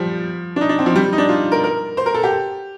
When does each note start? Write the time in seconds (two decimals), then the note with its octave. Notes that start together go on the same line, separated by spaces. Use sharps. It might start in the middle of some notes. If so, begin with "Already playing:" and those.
Already playing: F3 G3
0.56 D4
0.61 D#4
0.69 D4
0.79 C4
0.86 F3
0.96 G3
1.13 D#4
1.18 D4
1.29 F4
1.52 A#4
1.64 A#4
1.97 C5
2.06 A#4
2.14 A4
2.23 G4